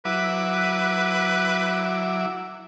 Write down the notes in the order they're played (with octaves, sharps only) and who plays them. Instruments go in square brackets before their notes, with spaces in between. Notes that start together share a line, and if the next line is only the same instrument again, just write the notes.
[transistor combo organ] F#3 E4 D6 [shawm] B4